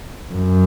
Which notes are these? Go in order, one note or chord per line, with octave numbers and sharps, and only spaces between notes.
F#2